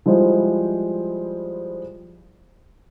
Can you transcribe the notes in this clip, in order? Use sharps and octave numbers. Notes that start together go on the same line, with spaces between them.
F3 G3 G#3 E4 C5